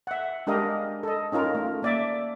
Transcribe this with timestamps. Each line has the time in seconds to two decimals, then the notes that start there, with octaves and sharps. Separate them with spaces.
0.07 E5 F#5
0.47 G#3 D4 G4 A#4 D#5 F5
1.03 A4 D#5
1.32 C#4 D#4 F4 A#4
1.55 A3
1.82 A#3 D5 E5